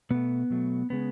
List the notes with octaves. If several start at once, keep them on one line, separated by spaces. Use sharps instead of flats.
B2 A3 B3
B2 F#3 A3
C#3 G#3 B3